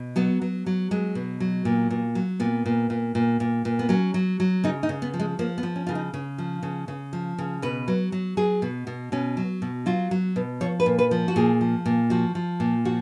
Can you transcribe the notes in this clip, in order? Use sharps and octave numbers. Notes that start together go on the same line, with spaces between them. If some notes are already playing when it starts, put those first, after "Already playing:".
Already playing: B2
F#3 B3
F#3
F#3
F#3 G#3
B2
F#3
A#2
A#2
F#3
A#2 B3
A#2
A#2
A#2
A#2
A#2
B3
F#3 C#4
F#3
F#3
C#3 D#4
D#4
C#3
B3
F3
G#3
F3 A#3
B3
F3
C#4
C#3 F4
D#4
C#3
F3
C#3
C#3
F3
C#3
B2 B4
F#3
F#3
F#3 G#4
B2
B2
B2 C#4
F#3
B2
F#3 F4
F#3
B2
F3 C#5
B4
A#2
B4
F3
F#4
A#2 G#4
F3
A#2
F3 F#4
F3
A#2
F3 F#4